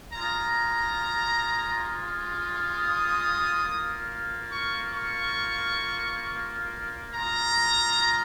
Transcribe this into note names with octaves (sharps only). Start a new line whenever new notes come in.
G#3 F4 A#5
D#6
A#3 F4
C#6
C#6
G#3 F4 A#5